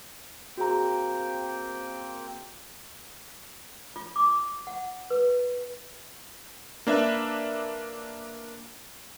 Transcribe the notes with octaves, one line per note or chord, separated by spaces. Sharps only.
A#3 C4 F#4 G#4 G5 A#5
F4
D6
F#5
B4
A#3 D4 B4 E5